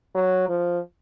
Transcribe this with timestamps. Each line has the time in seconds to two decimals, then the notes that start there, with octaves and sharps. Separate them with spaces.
0.15 F#3
0.49 F3